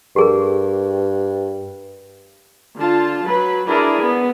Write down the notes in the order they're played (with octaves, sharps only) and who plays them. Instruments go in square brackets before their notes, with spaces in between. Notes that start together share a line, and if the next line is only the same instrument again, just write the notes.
[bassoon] G2 [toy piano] G4 G#4 A#4
[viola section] D3 F4 A5
F#3 B4
D4 E4 G#4 A#4 D5
B3